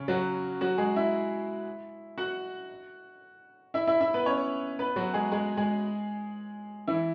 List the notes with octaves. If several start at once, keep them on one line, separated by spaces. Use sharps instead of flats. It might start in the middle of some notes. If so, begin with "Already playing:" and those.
Already playing: C#3 C#4
F#3 F#4
F#3 F#4
G#3 G#4
E4 E5
F#4 F#5
E4 E5
E4 E5
E4 E5
B3 B4
C#4 C#5
B3 B4
F#3 F#4
G#3 G#4
G#3 G#4
G#3 G#4
E3 E4